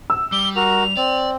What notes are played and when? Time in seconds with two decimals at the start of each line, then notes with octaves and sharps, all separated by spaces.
0.10 E6
0.32 G3 D6 G7
0.56 F#4 A#4 F7
0.97 C4 D5